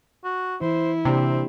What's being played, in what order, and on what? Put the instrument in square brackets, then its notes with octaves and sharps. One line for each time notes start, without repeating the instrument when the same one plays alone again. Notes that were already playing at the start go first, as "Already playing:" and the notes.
[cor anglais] F#4
[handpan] E3 [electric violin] E4 [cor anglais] C5
[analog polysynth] C3 [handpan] A#3 D4 G4 [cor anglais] C4